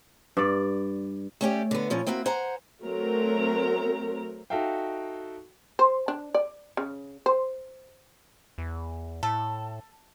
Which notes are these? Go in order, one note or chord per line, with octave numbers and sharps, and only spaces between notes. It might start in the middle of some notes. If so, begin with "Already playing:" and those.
G2 D5
A3 C#4 G4 D5
D3 B3
A#2 F3 C#4
A#3 C4 E4 F#4
C5 F#5 G#5 A#5
F#3 A3 C4 A#4 A#5
D#4 F#4 A4 E5 F5 G5
C5
D4
D5
C#3
C5
E2
A2 A4